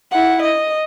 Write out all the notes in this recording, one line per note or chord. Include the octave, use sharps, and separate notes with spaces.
E4 F#5
D#5